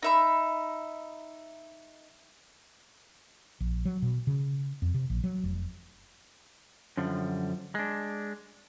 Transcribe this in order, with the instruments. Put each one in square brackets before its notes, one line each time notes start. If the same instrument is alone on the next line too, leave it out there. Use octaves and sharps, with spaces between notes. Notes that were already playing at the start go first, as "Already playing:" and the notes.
[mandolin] D#4 E5 B5
[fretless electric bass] A#1
F#3
B2
C#3
F2
C3
A#1
F#3
F1
[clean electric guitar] F#2 D3 F3 G3
G#3 D4